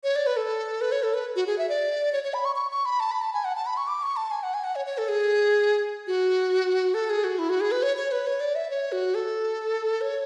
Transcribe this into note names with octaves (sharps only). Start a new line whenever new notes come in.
C#5
D5
B4
A4
B4
C#5
A4
B4
F#4
G#4
E5
D5
C#5
C#5
B5
C#6
C#6
C#6
B5
A5
B5
A5
G#5
F#5
A5
B5
C#6
D6
C#6
A5
G#5
F#5
G#5
F#5
C#5
C#5
A4
G#4
F#4
A4
G#4
F#4
E4
F#4
G#4
B4
C#5
C#5
B4
C#5
D5
E5
C#5
F#4
A4
C#5